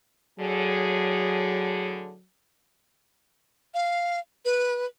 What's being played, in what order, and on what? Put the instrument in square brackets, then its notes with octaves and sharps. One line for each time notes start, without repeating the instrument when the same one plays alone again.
[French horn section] A2 D3 G#4 [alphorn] F#3
[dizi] F5
B4